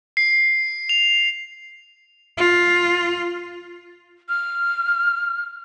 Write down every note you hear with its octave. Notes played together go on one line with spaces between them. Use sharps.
C7
F7
F4
F6